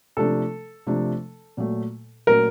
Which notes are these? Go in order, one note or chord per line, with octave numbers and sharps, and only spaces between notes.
C3 F3 A3 D4 A4
C3 F3 A3 D4
A#2 F#3 A3
A#2 F#3 A3 A#4